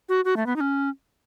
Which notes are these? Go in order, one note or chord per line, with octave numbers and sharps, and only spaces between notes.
F#4
F#4
A3
B3
D#4
C#4